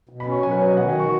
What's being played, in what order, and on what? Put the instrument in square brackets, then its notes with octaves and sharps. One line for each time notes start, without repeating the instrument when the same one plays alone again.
[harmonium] B2
[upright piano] B5
[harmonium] C#4
[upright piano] C#6
[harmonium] F#3 [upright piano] G#5
[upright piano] B4
[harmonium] B2 [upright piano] C#5
[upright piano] D#5
[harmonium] D#3 [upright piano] F#5
[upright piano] G#5
[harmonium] F#4
[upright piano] C#6